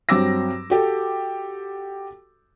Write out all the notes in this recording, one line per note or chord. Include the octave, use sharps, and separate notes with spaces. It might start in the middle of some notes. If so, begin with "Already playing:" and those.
G2 F#3 C4 D6 E6 A#6
F#4 G4 A4